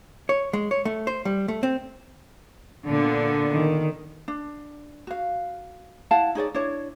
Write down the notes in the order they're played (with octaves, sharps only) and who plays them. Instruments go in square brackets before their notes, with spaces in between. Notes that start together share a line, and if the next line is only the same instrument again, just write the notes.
[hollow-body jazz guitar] C#5
G#3
C#5
A3
C5
G3
A3
C4
[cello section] A#2 D3 B3
[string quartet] D#3
[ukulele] D4
F#4 F5
E4 F5 F#5 A5
D#4 G#4 C#5 D5
D4 E4 C#5